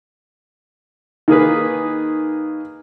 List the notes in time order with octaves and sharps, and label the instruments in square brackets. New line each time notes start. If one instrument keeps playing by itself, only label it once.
[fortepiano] D#3 A#3 G#4 B4